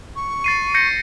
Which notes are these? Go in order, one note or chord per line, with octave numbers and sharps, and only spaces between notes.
C#6
A6 C7 D#7
G6 A#6 C#7